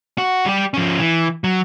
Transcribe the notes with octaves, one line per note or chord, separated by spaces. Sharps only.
F#4
G3 G4
F3 C#4
E3
F#3